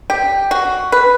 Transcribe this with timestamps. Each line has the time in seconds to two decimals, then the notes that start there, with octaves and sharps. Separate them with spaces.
0.10 G4
0.51 F#4
0.92 B4